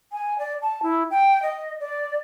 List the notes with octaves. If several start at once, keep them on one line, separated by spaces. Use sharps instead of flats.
G#5
D5
A5
E4
G5
D#5
D5